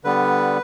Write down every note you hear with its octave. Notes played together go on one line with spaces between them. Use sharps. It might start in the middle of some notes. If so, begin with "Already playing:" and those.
D3 G3 B3 B4